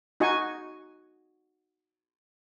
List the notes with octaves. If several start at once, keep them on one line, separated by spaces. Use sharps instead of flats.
D#4 F#4 D#5 G#5 C#6